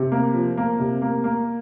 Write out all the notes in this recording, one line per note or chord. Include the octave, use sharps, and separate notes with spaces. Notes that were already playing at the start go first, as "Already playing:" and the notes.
Already playing: C3
A#3
F3
A#3
C3
A#3
A#3